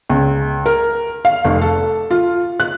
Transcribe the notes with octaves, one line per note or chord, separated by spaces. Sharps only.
C#2
A#4
F5
F1
A4
F4
F#6